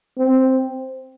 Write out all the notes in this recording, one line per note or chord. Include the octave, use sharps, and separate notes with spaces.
C4